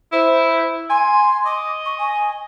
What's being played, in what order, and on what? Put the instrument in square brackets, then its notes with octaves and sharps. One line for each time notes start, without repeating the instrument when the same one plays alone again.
[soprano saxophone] E4 [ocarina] C5
[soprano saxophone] G#5 [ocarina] C6
[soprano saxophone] D#5 [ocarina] D6
[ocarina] C#6
G#5